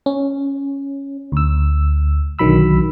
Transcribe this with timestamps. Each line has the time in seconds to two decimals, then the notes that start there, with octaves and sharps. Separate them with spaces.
0.06 C#4
1.32 D2 E6
2.39 B1 D3 D#3 F#3 B5 E6